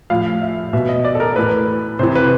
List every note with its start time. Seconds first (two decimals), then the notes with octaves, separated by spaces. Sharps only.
0.10 A2 F3 F5
0.42 E5
0.73 B2 E5
0.89 D#5
1.05 D5
1.15 A4
1.20 A#4
1.36 A2 E3 B4
1.99 C3 E3 C5
2.15 B4